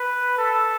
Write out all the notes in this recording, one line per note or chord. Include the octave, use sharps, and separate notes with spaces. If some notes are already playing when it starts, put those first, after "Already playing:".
Already playing: B4
A4